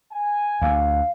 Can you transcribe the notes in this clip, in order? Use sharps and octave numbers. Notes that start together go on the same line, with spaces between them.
G#5
D2 F5